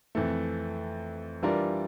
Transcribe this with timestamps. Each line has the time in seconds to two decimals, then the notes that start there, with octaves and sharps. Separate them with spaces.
0.15 F2 E3 A3
1.43 E3 G3 D4 F4 A#4